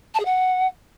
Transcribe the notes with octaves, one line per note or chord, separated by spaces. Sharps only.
A5
G#4
F#5